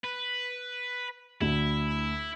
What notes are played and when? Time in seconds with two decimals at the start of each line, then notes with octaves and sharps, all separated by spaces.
0.04 B4
1.41 D2 E4